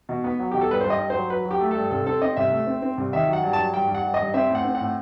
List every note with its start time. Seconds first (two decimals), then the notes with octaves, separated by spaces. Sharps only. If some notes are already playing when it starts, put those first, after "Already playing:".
0.09 B2
0.24 B3
0.40 F#3
0.52 B2 G4
0.61 A4
0.69 G2 B4
0.81 G2 C5
0.90 D#5
1.00 G2
1.10 F#3 C5
1.30 F#3 B4
1.45 F#3
1.51 G4
1.60 A3
1.71 G2 A4
1.91 C2 A4
2.06 C4 A4
2.22 C4 D#5
2.37 C2 E5
2.51 A3
2.67 C4
2.82 C4
2.98 C2
3.13 D#3 E5
3.27 F#3
3.33 F#5
3.43 G2
3.53 F#3 A5
3.74 G2 G5
3.88 G2
3.95 F#5
4.04 G2
4.14 D#5
4.19 G2
4.34 C4 E5
4.49 A2
4.55 F#5
4.65 C4
4.75 F#5
4.80 A2